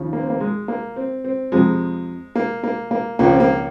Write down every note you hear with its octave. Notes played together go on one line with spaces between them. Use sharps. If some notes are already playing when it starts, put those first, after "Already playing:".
Already playing: D#2 C#3 F3
A#3
C4
A#3
G#3
A#3
C4
C4
F2 C3 F3 G#3
A#3
A#3
A#3
C#2 C#3 F3 A#3
C4
A#3